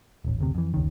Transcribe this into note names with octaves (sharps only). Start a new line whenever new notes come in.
D#1 A1
F#1 D2 C3
F2 E3
F1 C#2 D#3